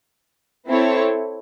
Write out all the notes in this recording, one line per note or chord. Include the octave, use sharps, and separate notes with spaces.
C4 E4 A4 C#5